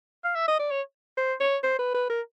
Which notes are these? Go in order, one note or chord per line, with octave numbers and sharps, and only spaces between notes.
F5
E5
D#5
D5
C#5
C5
C#5
C5
B4
B4
A#4